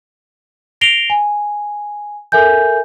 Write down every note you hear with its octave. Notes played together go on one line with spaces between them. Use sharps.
A#6 C7 D7 F7 G7
G#5
A4 A#4 E5 G#5 G6